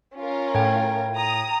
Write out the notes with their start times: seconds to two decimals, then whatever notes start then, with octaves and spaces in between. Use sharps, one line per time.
0.17 C#4 F4 A#4
0.55 A2 G5 G#6
1.16 A#5 D#6